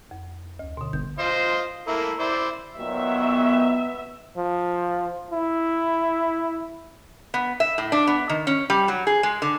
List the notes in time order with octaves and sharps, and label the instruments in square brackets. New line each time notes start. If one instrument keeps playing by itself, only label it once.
[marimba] F2
D2
B2 D3
[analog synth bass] G1 [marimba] G6
[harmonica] F4 C5 D#5
A3 A#3 E4
E4 C5 D5
[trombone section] A#2 D#3 F#3 [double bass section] B3 [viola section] E5
[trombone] F3
E4
[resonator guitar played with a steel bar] B3
E5
A2
D4
B3
D#3
C#4
G3
F#3
G#4
G#3
D3